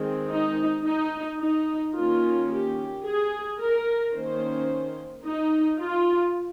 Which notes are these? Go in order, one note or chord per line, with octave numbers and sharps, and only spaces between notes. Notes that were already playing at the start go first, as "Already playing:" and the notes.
Already playing: D#3 G#3 C4
D#4
D#4
D#4
D#3 A#3 C#4 F4
G4
G#4
A#4
D#3 A#3 C#4 C5
D#4
F4